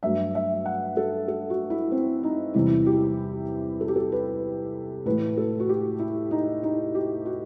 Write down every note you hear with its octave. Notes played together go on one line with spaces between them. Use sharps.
G2 F#3 A3 E5
E5
F#5
A4
A4
F#4
E4
C4
D#4
E2 C3 E3 G3 E4
G4
A4
G4
A4
B4
A2 E3 A3 B4
A4
F#4
G4
E4
D#4
D#4
G4
F#4